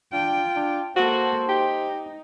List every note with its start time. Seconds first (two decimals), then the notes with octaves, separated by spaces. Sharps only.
0.13 D4 F4 G5
0.56 D4
0.97 A#3 F#4 A4 C5
1.49 D#4 G4